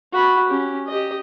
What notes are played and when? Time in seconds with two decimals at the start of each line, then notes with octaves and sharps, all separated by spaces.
0.13 F#4 B5
0.48 C#4 G4
0.87 G4 D#5